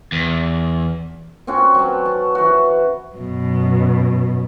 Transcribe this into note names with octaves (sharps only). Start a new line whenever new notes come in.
E2
C4 C#4 F#4
F#3 B4 A5
A5
E3 F#4
F#2 B2